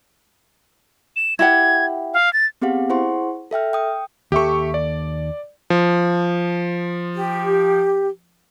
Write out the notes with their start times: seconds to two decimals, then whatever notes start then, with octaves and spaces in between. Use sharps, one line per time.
1.16 E7
1.39 E4 G4 F#5 G#6
2.14 F5
2.33 A6
2.62 B3 C4 G4 G#4 F5 F#5
2.90 E4 G#4 C5 F#5 C6 C#6
3.51 A4 E5 G5 F6
3.73 G5 D#6
4.32 D#2 G4 A4 E5 C#6
4.74 D5
5.70 F3
7.15 G4